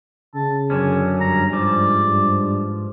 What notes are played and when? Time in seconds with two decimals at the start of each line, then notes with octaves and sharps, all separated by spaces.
0.35 C#3 A5
0.70 F#2 D3 C#4 G#5
1.21 G2 A#5
1.53 G#2 F3 D5
2.07 G2